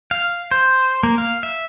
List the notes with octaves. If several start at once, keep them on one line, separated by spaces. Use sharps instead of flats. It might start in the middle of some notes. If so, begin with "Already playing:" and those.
F5
C5
A#3
F5
E5